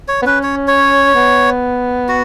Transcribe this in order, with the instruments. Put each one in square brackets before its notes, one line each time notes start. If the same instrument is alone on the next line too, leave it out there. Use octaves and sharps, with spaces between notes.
[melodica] C#5
[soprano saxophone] B3
[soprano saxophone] C#4 [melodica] B4
[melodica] C#5
C#5
[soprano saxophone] B3
[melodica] F#4